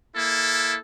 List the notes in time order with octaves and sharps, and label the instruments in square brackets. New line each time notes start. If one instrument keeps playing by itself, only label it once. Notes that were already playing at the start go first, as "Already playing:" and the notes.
[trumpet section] A#3 E4 A4